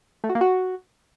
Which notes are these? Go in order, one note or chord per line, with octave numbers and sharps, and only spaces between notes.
A3
F#4
A#3
F#4